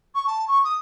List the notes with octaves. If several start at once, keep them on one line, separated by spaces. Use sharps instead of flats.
C#6
A5
C#6
D#6